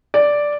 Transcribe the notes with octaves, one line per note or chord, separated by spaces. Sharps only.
D5